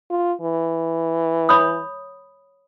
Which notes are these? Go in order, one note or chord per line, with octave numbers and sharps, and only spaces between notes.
F4
E3
C#5 B5 D#6